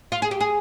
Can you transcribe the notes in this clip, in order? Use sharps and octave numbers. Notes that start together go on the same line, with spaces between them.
F4
G#4
G4
G#4